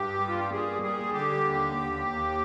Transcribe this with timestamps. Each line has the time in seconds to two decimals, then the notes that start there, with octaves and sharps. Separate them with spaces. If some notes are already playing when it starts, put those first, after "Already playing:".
Already playing: G2 G4
0.19 G3
0.28 F4
0.39 G4
0.51 A#2 G#4
0.83 G3 G#4
1.13 D3 G4
1.45 D#2
1.76 D#2
2.06 D#2